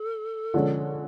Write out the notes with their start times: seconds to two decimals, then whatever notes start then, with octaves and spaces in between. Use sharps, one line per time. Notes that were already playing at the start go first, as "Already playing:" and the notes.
Already playing: A4
0.54 D3 F3 G#3 C#4